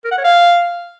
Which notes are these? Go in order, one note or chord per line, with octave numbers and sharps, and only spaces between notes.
A#4
F#5
C#5
F5